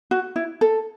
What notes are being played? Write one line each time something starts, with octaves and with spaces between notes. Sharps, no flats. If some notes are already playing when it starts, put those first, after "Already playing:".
F#4
E4
A4